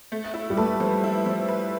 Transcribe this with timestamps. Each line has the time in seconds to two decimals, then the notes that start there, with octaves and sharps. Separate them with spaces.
0.12 A3
0.34 E4
0.50 G3
0.57 A3 B4
0.80 F3
1.04 E4
1.26 F3
1.48 B4